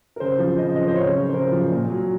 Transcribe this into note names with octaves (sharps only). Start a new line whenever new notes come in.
A#4
C#3 C5
F3
C#3 D#5
F3 D#5
C5
C#3 C#5
F3
C5
C#3 A#4
F3
A#2
F#3